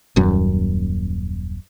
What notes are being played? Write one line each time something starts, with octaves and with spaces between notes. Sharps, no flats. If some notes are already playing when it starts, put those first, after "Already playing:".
D#1 F#2